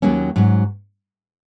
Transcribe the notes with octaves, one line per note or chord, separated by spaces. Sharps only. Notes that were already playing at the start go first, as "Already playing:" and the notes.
D#2 D#3 F#3 A#3 C#4
G#2 F#3 C#4 F#4